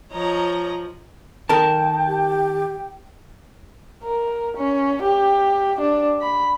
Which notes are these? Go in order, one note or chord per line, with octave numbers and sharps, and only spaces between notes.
F3 C#5 D#5 A#5
D#3 A4 A#4 G5 A5
G4
A#4
C#4
G4
D4
B5